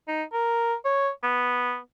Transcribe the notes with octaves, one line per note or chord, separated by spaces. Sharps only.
D#4
A#4
C#5
B3